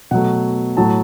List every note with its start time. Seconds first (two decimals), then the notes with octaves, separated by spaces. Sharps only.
0.11 B2 F#3 A3 F#5
0.77 A2 F#3 A3 A5